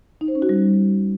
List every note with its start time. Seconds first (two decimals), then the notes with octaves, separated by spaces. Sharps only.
0.21 D#4
0.28 C5
0.35 C#4
0.42 F#4
0.49 G3